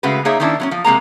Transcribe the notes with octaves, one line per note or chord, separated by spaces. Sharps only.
C#3 G#3 A3 F#4 B4
A#3 D#4 G#4 C#5 D#5 E5
D#3 A#3 C#4 D4 E4
F#3 B3 C#4
F3
C3 G#3 A#3 A#5